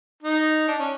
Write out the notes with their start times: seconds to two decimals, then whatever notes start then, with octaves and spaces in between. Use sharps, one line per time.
0.23 D#4
0.68 D4
0.79 C#4